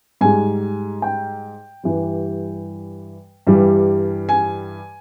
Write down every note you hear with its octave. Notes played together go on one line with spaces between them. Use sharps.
G#2 G3 G#5
G5
G2 E3 G3
G2 E3 G3
G#5